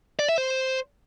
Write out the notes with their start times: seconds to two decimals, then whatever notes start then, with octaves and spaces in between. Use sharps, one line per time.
0.19 D5
0.29 E5
0.38 C5